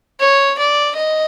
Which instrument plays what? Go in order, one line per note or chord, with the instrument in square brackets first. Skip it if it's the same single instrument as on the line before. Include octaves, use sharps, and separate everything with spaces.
[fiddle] C#5
D5
D#5